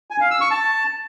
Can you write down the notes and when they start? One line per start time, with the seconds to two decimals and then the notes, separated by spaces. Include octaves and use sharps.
0.11 G#5
0.21 F5
0.31 E6
0.41 C#6
0.51 A5